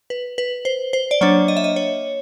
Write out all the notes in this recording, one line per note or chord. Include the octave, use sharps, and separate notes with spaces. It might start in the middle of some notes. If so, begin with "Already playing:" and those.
B4
B4
C5
C5
D5
F#3 A#3 D4 C#5
D#5
E5
D#5
C#5